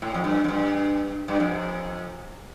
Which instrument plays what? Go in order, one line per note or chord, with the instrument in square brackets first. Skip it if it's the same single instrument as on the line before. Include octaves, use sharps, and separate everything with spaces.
[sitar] A2
F2
G2
F2
G2
G2
F2